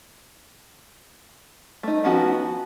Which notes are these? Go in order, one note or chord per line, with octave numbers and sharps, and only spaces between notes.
A3 D#4
D#3 F3 B3 C#4 F#4